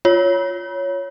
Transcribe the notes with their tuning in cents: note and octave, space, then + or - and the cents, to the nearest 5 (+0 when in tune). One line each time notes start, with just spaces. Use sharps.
F4 +0 C#5 +0